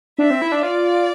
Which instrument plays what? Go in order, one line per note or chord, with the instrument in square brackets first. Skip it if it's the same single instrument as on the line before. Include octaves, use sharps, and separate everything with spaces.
[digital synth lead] D4 [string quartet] E5
[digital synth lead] C4
E4
D4
[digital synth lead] F4 [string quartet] D5